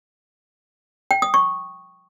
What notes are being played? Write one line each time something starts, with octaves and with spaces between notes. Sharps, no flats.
G5
D#6
C#6